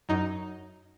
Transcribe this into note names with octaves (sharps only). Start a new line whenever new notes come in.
F#2 D#4